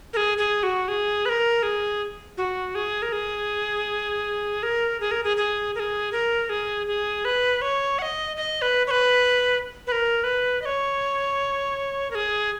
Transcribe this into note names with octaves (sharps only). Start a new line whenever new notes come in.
A#4
G#4
G#4
F#4
G#4
B4
A#4
G#4
F#4
G#4
A#4
G#4
A#4
G#4
A#4
G#4
G#4
A#4
G#4
A#4
G#4
G#4
B4
C#5
F#5
D#5
D#5
B4
C#5
B4
B4
A#4
B4
D#5
C#5
A#4
G#4